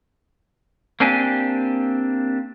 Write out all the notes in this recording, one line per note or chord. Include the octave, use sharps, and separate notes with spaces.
A#3 C4 D4 G4 G#5